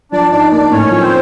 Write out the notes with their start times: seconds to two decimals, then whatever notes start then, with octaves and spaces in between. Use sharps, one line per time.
0.12 F3 D4 D5
0.31 D4 D#4 D5
0.51 A#3 D4 D5
0.71 A2 C#4 C#5
0.91 F3
1.00 C4 C5